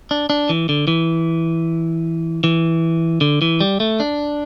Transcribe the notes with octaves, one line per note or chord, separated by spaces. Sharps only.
D4
D4
E3
D3
E3
E3
D3
E3
G3
A3
D4